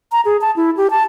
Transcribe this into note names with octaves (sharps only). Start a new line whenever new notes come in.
A#5
G#4
A5
E4
G4
A5